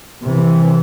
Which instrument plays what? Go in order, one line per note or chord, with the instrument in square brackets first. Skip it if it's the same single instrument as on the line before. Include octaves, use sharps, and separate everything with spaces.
[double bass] C3 E3